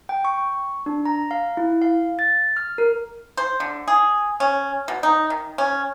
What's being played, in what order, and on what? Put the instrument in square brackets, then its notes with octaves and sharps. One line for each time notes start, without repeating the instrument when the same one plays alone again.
[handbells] G5
C#6
D4
A#5
F5
E4
F5
A6
F6
A#4
[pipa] C5
D3
G#4
C#4
B2
D#4
D#3
C#4